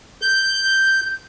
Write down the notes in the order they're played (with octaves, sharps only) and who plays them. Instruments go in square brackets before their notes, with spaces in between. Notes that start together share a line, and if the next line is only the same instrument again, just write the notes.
[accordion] G6